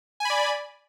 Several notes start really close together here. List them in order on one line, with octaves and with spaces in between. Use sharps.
G#5 B5 D5